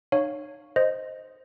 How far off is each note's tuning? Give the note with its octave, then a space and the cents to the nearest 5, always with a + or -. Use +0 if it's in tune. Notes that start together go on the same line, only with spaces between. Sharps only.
D#4 -40 C#5 +0 F5 +0
C5 +0 D#5 +0